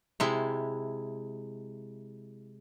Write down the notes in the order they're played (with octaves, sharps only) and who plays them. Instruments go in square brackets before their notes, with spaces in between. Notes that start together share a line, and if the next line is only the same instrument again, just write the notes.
[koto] C3 G#3 E4